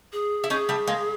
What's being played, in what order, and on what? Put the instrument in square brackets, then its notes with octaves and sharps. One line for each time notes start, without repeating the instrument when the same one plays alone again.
[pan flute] G#4
[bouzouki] E4
[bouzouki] C#4 D#4 [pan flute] G#4
[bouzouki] G3 A3
G#3 A#3